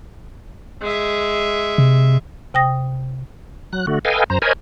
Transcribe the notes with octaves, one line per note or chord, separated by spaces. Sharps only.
G#3 E5
C3
C3 G5 D#6 A#6
F#3 F#6
D3 A3 F#4
A4 B4 D#5 F5 G5 G#5
F#2 C5 A#5
A#4 C5 C#5 D#5 G#5 B5